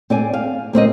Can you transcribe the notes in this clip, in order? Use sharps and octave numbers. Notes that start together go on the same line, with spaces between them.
C4 D5 G#5
F5
A#3 C4 C5 D#5